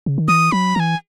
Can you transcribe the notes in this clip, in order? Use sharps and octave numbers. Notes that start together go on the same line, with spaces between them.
C#3
D#3
E3 D#6
F#3 B5
E3 G#5 A#5